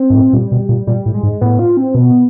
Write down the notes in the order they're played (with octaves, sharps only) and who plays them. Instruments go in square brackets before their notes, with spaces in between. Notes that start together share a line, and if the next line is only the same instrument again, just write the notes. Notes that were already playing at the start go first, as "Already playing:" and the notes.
Already playing: [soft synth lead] C4
[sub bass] G#2
A2
[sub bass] A#2 [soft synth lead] G3
[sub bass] B2
A#2
[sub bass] A#2 [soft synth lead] G3
[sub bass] A2
[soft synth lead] G#3
[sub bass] G#2
[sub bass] A2 [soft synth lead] B3
[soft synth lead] F4
C4
[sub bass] B2 [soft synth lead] B3